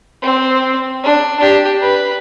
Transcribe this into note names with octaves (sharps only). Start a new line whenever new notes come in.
C4
D4
D4 G4
B4